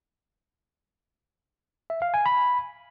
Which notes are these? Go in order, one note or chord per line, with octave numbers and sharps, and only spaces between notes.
E5
F5
G#5
B5